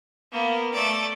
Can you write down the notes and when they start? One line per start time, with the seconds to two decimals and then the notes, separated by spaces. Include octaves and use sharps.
0.32 A#3 B3
0.74 A3 D5